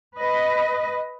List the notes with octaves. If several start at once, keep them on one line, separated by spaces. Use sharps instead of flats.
B4 D#5